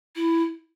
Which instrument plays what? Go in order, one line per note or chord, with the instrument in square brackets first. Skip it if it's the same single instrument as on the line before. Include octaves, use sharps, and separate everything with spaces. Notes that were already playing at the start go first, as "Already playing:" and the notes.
[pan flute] E4